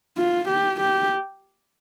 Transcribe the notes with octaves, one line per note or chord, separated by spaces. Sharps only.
F4
G4
G4